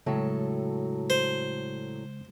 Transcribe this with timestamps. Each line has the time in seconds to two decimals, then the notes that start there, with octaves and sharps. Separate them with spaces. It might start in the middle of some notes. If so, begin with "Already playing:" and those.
0.06 A2 C#3 F#3 G#3 A4
1.10 C5